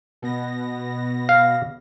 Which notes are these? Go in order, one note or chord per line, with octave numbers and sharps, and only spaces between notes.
B2 B3 A#6
F5